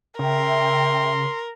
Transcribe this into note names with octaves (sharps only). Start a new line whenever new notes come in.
C#3 A#4 E5 G5 C6